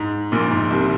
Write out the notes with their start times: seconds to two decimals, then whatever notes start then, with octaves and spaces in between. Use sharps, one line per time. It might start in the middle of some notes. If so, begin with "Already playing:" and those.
Already playing: G#2
0.32 A#1 A#2
0.51 G#2
0.70 C2 C3